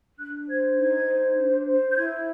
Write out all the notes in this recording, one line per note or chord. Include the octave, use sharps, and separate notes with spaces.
D4 F#6
C5 G#6
D#4 G#6
C5
D4
C5
G6
E4 G#6